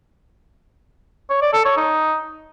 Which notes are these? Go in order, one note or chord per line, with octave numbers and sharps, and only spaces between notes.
C#5
D5
A4
C#5
D#4